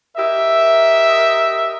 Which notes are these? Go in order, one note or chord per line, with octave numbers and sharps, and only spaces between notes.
G4 A#4 D#5 E5